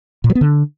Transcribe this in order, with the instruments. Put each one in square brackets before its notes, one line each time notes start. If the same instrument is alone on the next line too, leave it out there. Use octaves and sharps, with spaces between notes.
[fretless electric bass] A#2
F#3
B3
D3